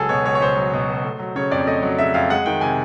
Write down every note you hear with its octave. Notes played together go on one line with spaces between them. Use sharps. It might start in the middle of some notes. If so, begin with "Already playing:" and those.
Already playing: C#2 F#3 G#4 A4
B2 C#5
C#2 C#5
C#5
C#2 C5
F#3
B2
C#2
A3
F#3
C#3 C#5
F2 D5
A3 D#5
F#3
C#3 E5
F2 F5
G#3 F#5
D#3 G5
C3 G#5